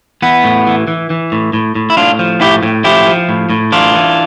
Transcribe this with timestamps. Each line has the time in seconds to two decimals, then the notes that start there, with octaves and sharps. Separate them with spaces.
0.22 E3 B3
0.44 A2
0.67 E3
0.87 E3
1.10 E3
1.32 A2
1.53 A2
1.75 A2
1.90 E4
1.97 A2 D4 F4
2.19 F3
2.41 A2 E4 G4
2.63 A2
2.84 F3 E4 G4
3.06 F3
3.29 A2
3.50 A2
3.72 E3 D4 F4
3.94 E3